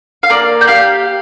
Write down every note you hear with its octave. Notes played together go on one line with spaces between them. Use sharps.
F5
A#3 D5
G5
G4 F5